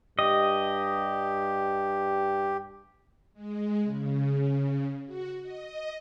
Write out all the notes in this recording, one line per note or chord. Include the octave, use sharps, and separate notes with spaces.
G2 G4 D#5
G#3
C#3
F#4
D#5